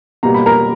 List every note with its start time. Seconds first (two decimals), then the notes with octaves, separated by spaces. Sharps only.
0.23 B2 G3 A#3 A#5
0.34 B5
0.46 A#4 A#5